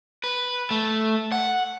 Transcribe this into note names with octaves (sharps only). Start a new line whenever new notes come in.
B4
A3
F#5